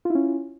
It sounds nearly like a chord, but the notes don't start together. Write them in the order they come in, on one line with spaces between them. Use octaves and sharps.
F4 E4 C#4